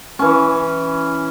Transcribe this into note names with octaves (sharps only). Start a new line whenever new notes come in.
E3 C#4